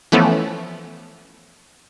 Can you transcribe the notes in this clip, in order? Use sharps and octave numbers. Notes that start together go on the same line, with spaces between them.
E3 F3 A3 B3 C#4